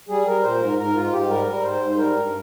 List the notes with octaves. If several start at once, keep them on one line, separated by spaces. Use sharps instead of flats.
G3 G#4
G3 A#4
A#2 C5
G#2 A#4
G#2 A#4
G#2 F4
G#2 G4
G3 A#4
G3
A#4
G#2 C5
G#2
C5
G3 A#4
G2